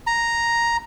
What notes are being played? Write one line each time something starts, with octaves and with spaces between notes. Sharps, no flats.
A#5